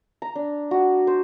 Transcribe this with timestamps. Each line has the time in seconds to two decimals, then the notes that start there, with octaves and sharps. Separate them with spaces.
0.22 A#5
0.35 D4
0.71 F#4
1.07 C5